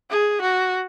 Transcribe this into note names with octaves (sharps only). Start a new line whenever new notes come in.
G#4
F#4